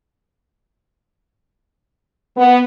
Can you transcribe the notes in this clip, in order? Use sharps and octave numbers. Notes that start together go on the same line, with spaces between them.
B3